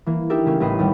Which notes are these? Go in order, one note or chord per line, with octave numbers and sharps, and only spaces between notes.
E3 A#3
D4 D#4 G4 A4 A#4 E5
C#3 A3 A#3 C#4
A1 A3 B4 D#5 C7
D#2 G3 B3